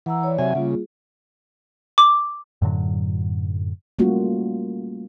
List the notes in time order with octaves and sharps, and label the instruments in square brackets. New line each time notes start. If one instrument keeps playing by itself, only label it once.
[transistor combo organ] E3 [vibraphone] F#5 A#5 E6
[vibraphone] C#5 D5
[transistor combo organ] C3 F#3 G#5 [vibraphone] E5 F#5
[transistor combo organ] C#3 [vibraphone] G3 A#3 F4
[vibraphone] G#4
[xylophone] D6
[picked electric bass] F#2 A2 D3 F#3
[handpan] G3 A3 A#3 C#4 F4 F#4